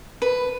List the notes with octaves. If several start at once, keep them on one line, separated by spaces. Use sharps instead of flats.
B4